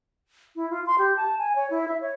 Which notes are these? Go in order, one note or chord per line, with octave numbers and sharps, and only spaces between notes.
E4
F4
C6
G4
A5
G#5
C#5
E4
E5
C#5